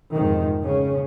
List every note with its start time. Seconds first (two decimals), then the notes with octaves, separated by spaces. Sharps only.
0.13 F2 G#2 C3 D#3
0.62 C#3 C#4